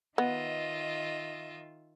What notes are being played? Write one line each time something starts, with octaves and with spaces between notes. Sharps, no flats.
D#3 B3 F4 D#5 E5